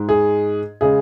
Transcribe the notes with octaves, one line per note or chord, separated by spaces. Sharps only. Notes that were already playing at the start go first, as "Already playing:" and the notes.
Already playing: G#2 G#3
G#4
C#3 G#3 G#4